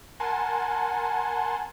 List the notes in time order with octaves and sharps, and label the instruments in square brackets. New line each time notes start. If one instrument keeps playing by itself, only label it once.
[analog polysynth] A#4 F#5 G#5 A5 C6